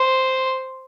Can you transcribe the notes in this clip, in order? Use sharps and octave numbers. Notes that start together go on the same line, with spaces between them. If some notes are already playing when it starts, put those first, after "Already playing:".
Already playing: C5